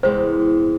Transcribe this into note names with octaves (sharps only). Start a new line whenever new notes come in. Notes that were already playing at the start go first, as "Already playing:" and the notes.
E2 C3 E3 G#3 C5